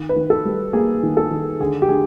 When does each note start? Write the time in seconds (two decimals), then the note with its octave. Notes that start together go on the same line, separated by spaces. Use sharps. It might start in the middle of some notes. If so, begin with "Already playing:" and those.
Already playing: D#3
0.09 B4
0.16 D#3
0.30 A4
0.45 G3
0.73 A#3 G#4
1.03 D#3
1.17 A4
1.31 D#3
1.60 D3 G#4
1.82 G4
1.89 D3 G#4